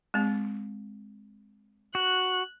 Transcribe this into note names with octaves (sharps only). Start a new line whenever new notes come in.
G#3 C4
F#4 F#6